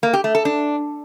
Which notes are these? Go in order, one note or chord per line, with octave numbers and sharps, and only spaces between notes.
A#3
G4
A3
A4
D4